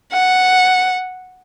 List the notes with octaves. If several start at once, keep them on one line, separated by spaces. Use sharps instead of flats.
F#5